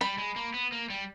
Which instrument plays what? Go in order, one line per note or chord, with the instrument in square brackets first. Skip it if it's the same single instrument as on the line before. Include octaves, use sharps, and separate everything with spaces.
[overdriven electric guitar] G3 [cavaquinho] B5
[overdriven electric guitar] G#3
A#3
B3
A#3
G3